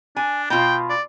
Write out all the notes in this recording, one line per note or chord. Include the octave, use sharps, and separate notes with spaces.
D4 G#5
B2 F4 G5
D5